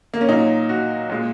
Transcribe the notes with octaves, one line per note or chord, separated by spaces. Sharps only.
A#3
C#4
A#2 F#3 D#4
F#4
A#2 G#3